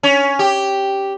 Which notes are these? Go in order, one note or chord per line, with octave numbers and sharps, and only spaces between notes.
C#4
G4